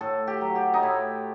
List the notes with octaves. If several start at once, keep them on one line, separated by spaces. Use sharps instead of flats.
A2 A4
G4
F#3
G4
D#4
A2 E4